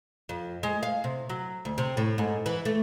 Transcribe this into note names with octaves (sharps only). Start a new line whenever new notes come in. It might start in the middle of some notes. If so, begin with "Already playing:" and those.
F2
G#3
F5
C3
F#3
D2
C3
A2
G#2
E3
A3